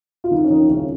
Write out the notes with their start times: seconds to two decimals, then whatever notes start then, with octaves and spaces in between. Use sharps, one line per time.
0.24 F4
0.31 C2 D#3 D#4
0.44 C#4
0.50 D#3 F3 D#4
0.69 C2 C#3 C#4